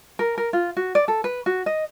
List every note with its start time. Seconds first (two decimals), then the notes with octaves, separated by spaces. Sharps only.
0.19 A#4
0.38 A#4
0.53 F4
0.77 F#4
0.95 D5
1.08 A4
1.24 B4
1.46 F#4
1.66 D#5